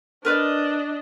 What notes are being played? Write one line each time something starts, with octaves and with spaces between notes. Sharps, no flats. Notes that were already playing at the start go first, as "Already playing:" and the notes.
D4 A#4 B4 D5 D#5